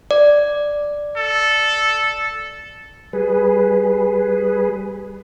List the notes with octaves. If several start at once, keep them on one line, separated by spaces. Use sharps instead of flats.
D5
A4
G3 G#4 B4